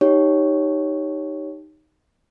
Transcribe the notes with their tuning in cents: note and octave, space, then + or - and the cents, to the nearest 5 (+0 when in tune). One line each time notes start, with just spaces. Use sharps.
D#4 +0 G4 +0 C#5 +0